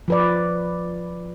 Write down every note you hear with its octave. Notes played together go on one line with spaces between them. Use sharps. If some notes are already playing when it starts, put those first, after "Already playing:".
F3 B4 D5